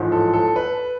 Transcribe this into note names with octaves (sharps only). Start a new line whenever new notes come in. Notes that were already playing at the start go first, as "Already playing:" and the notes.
Already playing: A1 G#2 F3
A4
A4
B4